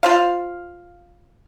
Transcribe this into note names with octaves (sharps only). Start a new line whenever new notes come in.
F4 C5 F5